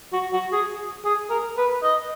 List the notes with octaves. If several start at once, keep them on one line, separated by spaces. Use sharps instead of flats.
F#4
F#4
G#4
G#4
A#4
B4
D#5